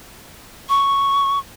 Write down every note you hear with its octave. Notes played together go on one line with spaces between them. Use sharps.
C#6